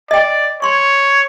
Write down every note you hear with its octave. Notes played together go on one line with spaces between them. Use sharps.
D5 D#5 G5
C#5 C6 C#6